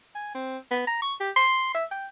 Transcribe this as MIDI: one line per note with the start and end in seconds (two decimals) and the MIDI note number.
0.15 0.33 80
0.34 0.57 60
0.71 0.82 59
0.87 1.00 82
1.02 1.14 85
1.20 1.31 67
1.36 1.71 84
1.75 1.85 76
1.91 2.07 79